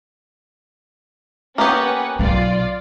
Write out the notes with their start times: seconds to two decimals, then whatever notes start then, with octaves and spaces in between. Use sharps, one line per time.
1.58 A#3 B3 C#4 G4 B4 F#5
2.19 B1 B2 F4 D5